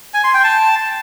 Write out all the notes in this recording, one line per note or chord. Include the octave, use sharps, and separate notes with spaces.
G#5
C6
G5
A5